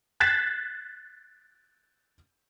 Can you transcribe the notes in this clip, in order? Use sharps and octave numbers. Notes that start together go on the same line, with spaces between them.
F#6 G#6 A6 B6 C7 E7